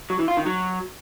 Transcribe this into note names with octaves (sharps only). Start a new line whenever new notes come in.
F#3
E3
F4
D#3
F#3